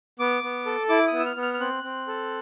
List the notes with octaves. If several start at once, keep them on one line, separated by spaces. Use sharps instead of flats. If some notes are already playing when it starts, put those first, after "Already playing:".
B3 D6
B3
A4
E4 D6
D#6
B3
E6
F6
B3
F6
F6
C4 F#6
C4
A4